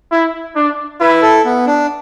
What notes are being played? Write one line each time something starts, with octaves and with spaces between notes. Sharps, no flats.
E4
D4
E4 B4
A4
B3
D4